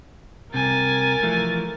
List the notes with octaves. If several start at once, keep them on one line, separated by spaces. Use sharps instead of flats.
C2 C3 A#4 G#5 A6
E3 F3 A3